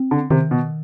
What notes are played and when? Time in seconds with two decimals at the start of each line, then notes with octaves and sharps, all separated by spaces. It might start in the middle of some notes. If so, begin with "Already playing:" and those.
Already playing: C4
0.11 D3
0.31 C3 D#3
0.51 B2